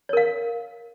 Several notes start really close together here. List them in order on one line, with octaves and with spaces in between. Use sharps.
C#5 A#4 F5